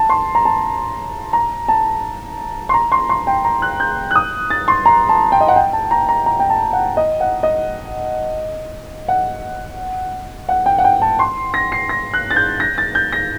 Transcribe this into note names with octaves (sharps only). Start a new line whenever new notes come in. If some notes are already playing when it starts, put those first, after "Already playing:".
Already playing: A5
C6
A#5
A5
A#5
A5
C6
A#5
C6
C6
G5
A#5
F#6
G6
F#6
D#6
A6
C6
A#5
A5
G5
D#5
F#5
G5
A5
A#5
A#5
A#5
G5
A5
F#5
D#5
F#5
D#5
F#5
F#5
G5
F#5
G5
A5
C6
A#6
C7
A#6
F#6
A6
G6
A#6
A6
G6
A#6